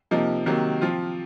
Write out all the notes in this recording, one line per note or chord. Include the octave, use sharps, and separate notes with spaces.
C3 F3 A#3 D#4
C3 D#3 F#3 A#3
F3 C4 F4